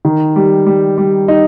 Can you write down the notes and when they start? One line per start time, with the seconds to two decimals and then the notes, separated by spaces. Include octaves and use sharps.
0.05 D#3
0.36 G3
0.66 G3
0.98 G3
1.28 D#4